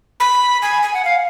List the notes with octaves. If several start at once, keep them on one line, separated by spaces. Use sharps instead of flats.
B5
G#5
G#5
F#5
F5